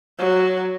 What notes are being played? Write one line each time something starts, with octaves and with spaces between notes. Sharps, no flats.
F#3